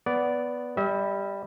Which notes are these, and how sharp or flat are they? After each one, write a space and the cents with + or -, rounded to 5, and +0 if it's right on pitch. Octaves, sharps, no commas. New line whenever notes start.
B3 +0 D5 -15
G3 +10 E5 -35